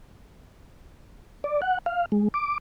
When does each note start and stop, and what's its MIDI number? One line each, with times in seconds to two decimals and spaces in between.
1.44 1.61 74
1.62 1.78 78
1.86 2.06 77
2.12 2.28 56
2.34 2.58 86